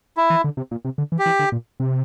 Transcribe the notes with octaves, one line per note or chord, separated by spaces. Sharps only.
E4
E3
D3
C3
A#2
C3
D3
E3
G4
E3
D3
A#2
C3